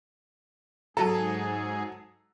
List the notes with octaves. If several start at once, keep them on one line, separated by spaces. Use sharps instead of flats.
G#2 F#3 G#4 A4 A5 A#5